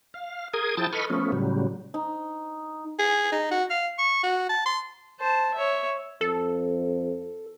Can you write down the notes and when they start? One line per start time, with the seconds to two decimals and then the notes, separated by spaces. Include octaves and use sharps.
0.14 F5
0.54 G#4 A#4 D#6 G#6
0.77 F3 E4 G5 A5 D#6 A6
0.93 A4 B4 D#5 B5 C#6 F6
1.10 F3 A3 B3 C#4
1.32 A2 C#3 F#3 G3
1.94 D#4
2.99 G#4
3.32 D#4
3.51 F#4
3.70 F5
3.98 C#6
4.23 F#4
4.49 A5
4.66 C6
5.20 C5 A5
5.54 C#5 E5
6.21 F2 A4